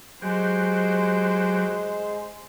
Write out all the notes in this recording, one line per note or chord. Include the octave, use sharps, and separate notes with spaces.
F#3 G#3 G4 C5